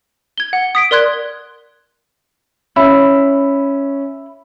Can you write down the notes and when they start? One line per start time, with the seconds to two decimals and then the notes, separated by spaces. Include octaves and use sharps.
0.37 G#6 G7
0.53 F#5
0.75 D#6 B6 D7
0.91 A#4 D5 C6 F#6 G#6
2.76 C#4 E4